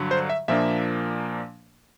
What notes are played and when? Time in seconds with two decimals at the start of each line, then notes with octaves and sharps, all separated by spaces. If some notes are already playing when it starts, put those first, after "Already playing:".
Already playing: G2 D3 F#3
0.11 C5
0.30 E5
0.48 A#2 F3 A#3 D4 E5